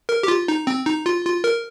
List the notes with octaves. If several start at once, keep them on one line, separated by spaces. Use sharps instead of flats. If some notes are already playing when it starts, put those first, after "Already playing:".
A#4
G4
F4
D#4
C4
D#4
F4
F4
A#4